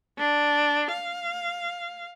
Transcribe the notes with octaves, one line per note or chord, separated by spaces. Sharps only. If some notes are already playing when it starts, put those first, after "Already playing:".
D4
F5